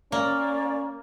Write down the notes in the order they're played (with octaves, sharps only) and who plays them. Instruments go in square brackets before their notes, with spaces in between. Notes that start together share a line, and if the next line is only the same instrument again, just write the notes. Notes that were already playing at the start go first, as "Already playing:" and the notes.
[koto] A#3 [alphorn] C#4 [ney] D5